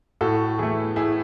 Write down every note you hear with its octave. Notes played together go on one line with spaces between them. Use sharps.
A2 F#4 A4
E3 A3 E4 G#4
A2 E4 G#4